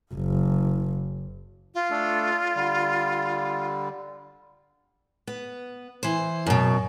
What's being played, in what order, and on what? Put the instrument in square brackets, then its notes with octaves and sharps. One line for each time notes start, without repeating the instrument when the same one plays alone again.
[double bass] F#1
[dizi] F4
[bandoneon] A3 D4 A4
D3 G3
[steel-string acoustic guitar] B3
E3 C5
F#2 B2